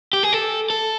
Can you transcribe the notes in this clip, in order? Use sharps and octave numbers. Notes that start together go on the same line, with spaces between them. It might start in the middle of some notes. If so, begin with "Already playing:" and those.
G4
G#4
A4
A4